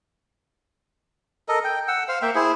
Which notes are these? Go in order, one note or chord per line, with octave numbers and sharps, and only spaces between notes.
A4 A#4 D#5
G5
F#5 E6
C5 F5
A#3 E5 G5
E4 G#4 C5